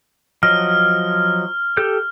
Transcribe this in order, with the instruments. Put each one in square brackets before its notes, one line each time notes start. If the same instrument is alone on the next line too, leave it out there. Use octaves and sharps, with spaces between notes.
[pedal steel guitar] F3 F#3 D#5 [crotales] F6
[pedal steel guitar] G4 A4 G6